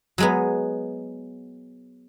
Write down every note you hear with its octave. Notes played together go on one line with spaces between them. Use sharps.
F#3 G#3 B3